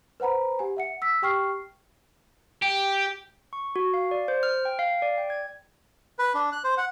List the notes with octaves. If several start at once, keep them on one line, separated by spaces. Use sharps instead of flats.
B4 C5 F#5 A#5 B5
G4 G#5
E5 F#5 C#7
E6 B6
G4 G5 C#6 F6 C7
G4
C#6
F#4
F5
D5
C5
F6
G5
F5
D5
G5
G#6
B4
D4
F#6
C5
F#5